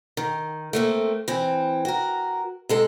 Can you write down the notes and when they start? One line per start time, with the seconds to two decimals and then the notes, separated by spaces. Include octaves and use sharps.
0.17 D#3
0.73 A3 A#3 C4
1.28 E3 C4
1.85 F#4 A#4
2.69 C3 G#3 A4